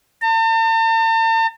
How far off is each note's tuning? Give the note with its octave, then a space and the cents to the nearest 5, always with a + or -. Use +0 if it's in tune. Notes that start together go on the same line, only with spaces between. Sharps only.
A5 +45